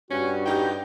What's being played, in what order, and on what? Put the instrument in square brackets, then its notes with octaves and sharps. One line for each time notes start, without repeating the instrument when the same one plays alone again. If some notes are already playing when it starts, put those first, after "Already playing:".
[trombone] G2 [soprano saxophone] C#4 [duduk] F#4
[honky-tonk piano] C#4 D#4 G4 [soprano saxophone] G5